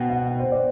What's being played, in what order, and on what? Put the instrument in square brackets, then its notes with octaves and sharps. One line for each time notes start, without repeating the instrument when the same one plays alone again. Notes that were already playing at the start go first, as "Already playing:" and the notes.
Already playing: [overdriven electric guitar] B2 [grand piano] F#5 G5
[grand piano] F#5
C5
D5